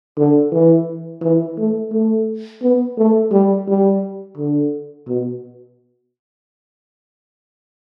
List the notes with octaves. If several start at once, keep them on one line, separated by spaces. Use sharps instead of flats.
D3
E3
E3
A3
A3
B3
A3
G3
G3
D3
B2